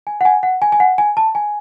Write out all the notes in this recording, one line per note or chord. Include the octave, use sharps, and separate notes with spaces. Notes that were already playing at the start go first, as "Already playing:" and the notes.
G#5
F#5
G#5
F#5
G#5
G#5
F#5
G#5
A5
G#5